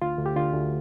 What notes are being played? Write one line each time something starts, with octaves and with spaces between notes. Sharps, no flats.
D2 F4
D2
G4
D3 F4
D2